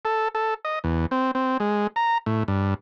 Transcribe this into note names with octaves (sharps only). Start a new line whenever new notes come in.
A4
A4
D#5
E2
C4
C4
G#3
A#5
A2
G2